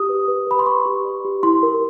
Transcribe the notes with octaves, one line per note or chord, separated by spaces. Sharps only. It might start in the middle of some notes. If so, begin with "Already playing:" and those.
Already playing: G4 D#6
B4
B4
B4 B5
C6
B4 C#6
G4
D5
G4
E4 C6
A#4